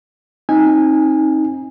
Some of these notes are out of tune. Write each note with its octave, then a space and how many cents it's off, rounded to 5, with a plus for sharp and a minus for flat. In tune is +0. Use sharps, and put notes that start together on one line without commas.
C4 +35 D#4 +15 G#5 -15